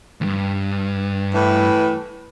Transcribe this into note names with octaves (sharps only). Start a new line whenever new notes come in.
D2 G2
A2 E3 B4